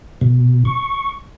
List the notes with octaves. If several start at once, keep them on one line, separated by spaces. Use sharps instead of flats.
B2
C#6